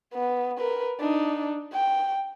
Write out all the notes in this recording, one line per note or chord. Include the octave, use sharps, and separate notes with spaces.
B3
A#4 B4
D4 D#4
G5